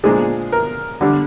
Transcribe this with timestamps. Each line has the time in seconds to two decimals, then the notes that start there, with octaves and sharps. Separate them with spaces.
0.04 A#2 F3 G#3 D4 G#4
0.52 A#4
1.01 D3 G3 D4